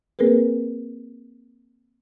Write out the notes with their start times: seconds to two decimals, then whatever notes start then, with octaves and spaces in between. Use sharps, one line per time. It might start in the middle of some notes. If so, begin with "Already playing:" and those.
0.19 A#3 C4 G#4 A#4 B4